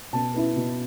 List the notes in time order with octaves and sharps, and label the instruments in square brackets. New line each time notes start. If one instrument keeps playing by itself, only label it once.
[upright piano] B2 A5
B3 E4
B2